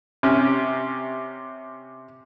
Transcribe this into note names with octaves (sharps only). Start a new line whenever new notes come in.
C3 C#4